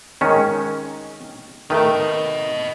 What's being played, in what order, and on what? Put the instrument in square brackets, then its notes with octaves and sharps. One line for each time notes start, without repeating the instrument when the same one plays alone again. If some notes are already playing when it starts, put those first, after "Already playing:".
[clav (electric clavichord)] D#3 G#3 C#4
[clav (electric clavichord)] D#3 A3 [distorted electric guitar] B4 D#5